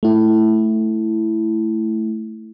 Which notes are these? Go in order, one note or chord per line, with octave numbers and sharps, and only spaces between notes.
A3 E4